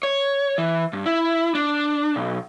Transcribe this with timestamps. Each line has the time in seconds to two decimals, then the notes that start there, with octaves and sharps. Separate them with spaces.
0.03 C#5
0.58 E3
0.93 G2
1.06 E4
1.55 D4
2.16 B1